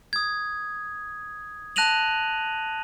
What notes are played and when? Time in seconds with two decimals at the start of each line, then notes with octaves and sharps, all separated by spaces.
0.13 D#6 G#6
1.76 A5 F#6 A#6 D#7 F7 F#7